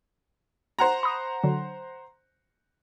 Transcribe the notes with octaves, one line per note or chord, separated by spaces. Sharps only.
C5 F#5 A#5
B5 D#6
D3 F#3